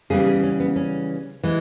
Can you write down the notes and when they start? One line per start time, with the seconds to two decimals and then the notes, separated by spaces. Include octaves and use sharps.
0.10 C#3 E3 G3 B3 G#4
0.27 G#4
0.43 C#4
0.60 B3
0.76 C#4
1.43 E3 G#3